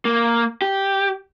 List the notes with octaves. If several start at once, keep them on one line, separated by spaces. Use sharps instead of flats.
A#3
G4